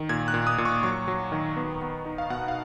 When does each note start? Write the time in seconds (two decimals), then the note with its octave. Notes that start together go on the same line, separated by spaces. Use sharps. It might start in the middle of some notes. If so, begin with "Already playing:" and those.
Already playing: D#3
0.09 A#2 G#6
0.28 F#6
0.34 A#2
0.47 D#6
0.58 A#2
0.65 C#6
0.83 F#3 C#6
1.08 F#3
1.32 D#3
1.56 B3
1.82 B3
2.05 D#4
2.18 F5
2.30 B2 F#5
2.48 F5